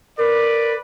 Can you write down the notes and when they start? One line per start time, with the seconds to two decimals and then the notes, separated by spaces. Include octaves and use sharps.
0.18 A#4 B4 D5